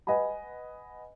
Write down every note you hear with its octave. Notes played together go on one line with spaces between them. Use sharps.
B4 D#5 F#5 G#5 B5